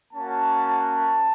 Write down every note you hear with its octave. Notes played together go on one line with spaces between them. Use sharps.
A#3 C#4 F#4 A5
A5